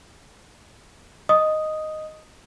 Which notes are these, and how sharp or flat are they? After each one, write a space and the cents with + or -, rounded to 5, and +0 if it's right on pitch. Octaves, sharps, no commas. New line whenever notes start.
D#5 +0 D#6 +0